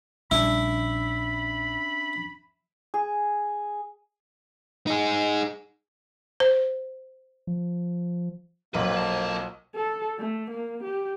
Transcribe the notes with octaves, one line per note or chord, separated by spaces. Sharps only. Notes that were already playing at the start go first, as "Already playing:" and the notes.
A#1 G3 C#4 D4 E4 B5
G#4
D#4 G#4
C5
F3
B1 F2 A#3 B4
C2 A5
A4
A3
A#3
G4